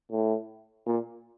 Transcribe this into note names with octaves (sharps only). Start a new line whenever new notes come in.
A2
A#2